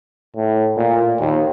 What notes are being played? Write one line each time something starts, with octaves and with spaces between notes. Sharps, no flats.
A2
A#2
D#2